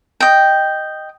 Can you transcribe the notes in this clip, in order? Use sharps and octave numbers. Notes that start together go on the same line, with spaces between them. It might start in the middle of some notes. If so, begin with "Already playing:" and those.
D#5 G5